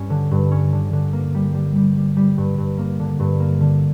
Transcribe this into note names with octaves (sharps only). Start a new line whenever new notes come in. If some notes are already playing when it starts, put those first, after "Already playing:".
Already playing: G2 C#4
D3
G2
C#4
D3
D3
A#3
G3
G3
G3
G3
G3
G2
G2
A#3
D3
G2
A#3
D3